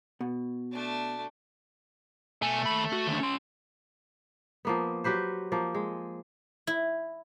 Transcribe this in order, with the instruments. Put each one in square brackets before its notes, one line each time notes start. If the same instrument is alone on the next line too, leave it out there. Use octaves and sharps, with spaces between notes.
[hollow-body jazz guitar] B2 [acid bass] B3
[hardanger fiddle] A3 D4
[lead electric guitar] B2 G#5 [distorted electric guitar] A3
[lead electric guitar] D#2 B5
F#4
D#2 D3
C#4 C6
[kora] F3 A#3 B3
F#3 G4 B4 C5
F3 A#3
G#3
[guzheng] E4